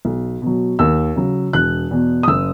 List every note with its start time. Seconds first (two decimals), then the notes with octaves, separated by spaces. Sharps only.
0.05 B1
0.42 B2 F#3
0.79 D#2 E6
1.16 C#3 F#3
1.53 E1 F#6
1.91 E2 B2
2.23 D#6
2.28 F#1 E6